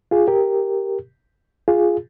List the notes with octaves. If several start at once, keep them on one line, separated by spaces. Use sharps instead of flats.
F4 G#4
G4 A#4
F4 G#4